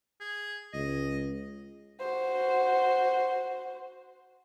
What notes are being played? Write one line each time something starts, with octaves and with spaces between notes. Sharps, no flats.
G#4
C#2 D#5
F#4 C5